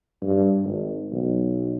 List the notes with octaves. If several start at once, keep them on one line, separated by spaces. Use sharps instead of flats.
G2
G#1
B1